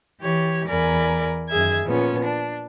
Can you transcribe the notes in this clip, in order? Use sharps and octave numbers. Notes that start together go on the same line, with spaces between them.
E3 G4 C#5
E2 A#4 D5 G#5 B5
F#2 D#3 G#4 E5 G#6
A#2 F3 B3 C#4
D4